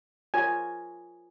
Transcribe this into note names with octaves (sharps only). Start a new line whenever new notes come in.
F4 A#4 C#5 G#5